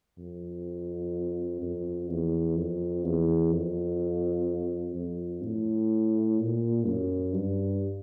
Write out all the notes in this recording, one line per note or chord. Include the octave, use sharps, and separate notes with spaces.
F2
F2
E2
F2
E2
F2
F2
A2
A#2
F#2
G2